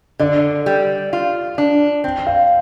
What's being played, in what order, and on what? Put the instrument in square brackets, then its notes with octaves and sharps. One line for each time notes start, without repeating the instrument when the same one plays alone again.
[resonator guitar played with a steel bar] D3 [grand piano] D5
[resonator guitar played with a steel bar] G3
F4
D4
C4
[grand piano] F5